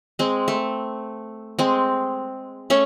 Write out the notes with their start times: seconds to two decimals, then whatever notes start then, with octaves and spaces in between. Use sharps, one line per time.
0.19 G#3 C4
0.48 A3
1.59 G#3 C4
2.70 A3 C#4